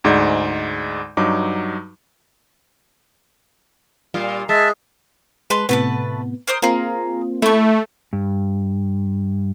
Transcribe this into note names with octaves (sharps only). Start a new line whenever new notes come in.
D2 G#2 G#3 D#4 D5 G6
G2 F#3 D#4 D6
A#2 G3 F4
G#3 E5 A5
G#3 B4 A5 C6
A2 C3 A3 B3 B4 A5
A#4 C5 D#6
A#3 C4 F4 G#4 A#4
A3 E4 C#6
G2